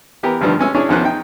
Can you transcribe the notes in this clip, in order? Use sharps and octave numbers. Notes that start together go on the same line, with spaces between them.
E3 B3 G4 A#4
A1 G2 D3 D#3 F3 G3
G#3 C#4 E6
C#4 D4 E4 G#4 C#5
E2 D#3 F3 C#4 C5 F#6
D#4 G5